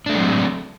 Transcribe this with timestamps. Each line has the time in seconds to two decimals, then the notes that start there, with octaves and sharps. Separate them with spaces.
0.06 D4
0.09 A3
0.13 G#3
0.16 F#3
0.19 C4